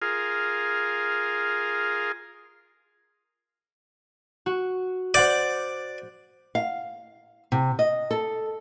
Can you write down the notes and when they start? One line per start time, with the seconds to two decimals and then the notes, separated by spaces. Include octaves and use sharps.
0.02 F4 G#4 A#4
4.46 F#4
5.14 C5 D5 F#5 G6
6.55 F5
7.52 C3
7.79 D#5
8.11 A4